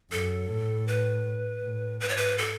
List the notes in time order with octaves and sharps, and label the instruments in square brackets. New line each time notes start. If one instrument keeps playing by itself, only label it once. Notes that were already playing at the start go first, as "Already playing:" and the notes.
[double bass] F#2 [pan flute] A4
[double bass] A2
[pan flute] B4
[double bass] A2
[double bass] G#2 [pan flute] B4
[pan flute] C#5
B4
A4